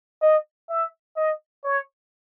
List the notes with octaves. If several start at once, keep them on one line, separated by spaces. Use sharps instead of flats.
D#5
E5
D#5
C#5